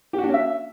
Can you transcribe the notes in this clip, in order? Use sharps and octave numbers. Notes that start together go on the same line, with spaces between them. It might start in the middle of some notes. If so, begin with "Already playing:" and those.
G4
F#4
D4
C#4
E5